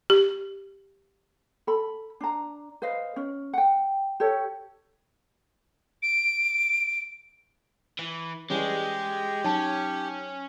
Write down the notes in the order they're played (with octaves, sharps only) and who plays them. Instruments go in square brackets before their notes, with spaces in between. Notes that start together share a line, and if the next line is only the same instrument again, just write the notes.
[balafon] G4
[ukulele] A4 B5
D4 A#5
B4 C5 D#5 F5
C#4
F#5 G5
G4 A4 C#5
[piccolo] D7
[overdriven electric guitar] E3
[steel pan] E3 G3 C#4 [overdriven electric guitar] G#3 [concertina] G4
[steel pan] F#3 [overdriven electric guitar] C#4 [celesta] D#4 A5